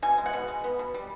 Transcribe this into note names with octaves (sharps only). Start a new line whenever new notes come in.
B2 G#5
G#3
F#5
B2
G#3
B3
B2
G3